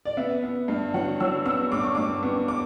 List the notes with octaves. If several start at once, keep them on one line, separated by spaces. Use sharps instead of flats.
D5
B3 E5
B3
G2
F#3 F#5
F#3 E6
B3 E6
G2 D6
C#6
G2 D6
B3
D6